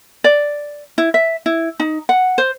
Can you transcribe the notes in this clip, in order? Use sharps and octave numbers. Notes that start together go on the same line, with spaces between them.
D5
E4
E5
E4
D#4
F#5
C5